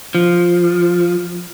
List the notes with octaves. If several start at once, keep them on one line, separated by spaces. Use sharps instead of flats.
F3